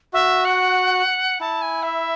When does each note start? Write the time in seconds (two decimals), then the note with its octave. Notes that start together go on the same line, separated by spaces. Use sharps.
0.13 F#4 E5
0.45 F#5
1.40 E4 A5
1.62 G#5
1.83 E5